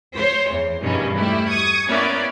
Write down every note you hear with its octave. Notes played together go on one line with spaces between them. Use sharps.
C5 C#5
E2
E2 G2 B2 D#3 G3 C#4
G3 A3 E4 G4
C#6 D#6 G#6
A#3 B3 C#4 E4 D5